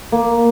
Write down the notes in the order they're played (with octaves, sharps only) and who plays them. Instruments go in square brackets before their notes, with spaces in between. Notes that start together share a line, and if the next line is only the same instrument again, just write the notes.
[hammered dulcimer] A#3